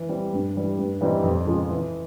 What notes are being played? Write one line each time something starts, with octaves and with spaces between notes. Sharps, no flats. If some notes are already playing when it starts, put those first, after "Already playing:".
Already playing: E3
G3 C4
G2
E3 G3
G2
E3 G3 C4 D#4
F2
C#3 F3 G#3
E3